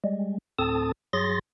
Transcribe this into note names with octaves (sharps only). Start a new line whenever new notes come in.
G3 G#3
D2 A2 C4 A4 A5 D#6
G2 F#3 G#4 C6 A6 A#6